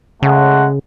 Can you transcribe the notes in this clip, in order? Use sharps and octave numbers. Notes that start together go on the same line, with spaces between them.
C#3 G#3 A3 F#5